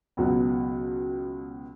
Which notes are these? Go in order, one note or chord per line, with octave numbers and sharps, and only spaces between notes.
C#2 B2 F#3 B3 F#4